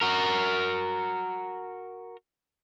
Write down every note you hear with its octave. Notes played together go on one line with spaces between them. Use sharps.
F#4 A#4